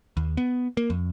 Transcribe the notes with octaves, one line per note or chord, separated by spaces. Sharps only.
D#2
B3
A#3
F2